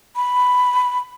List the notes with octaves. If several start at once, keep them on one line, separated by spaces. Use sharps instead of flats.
B5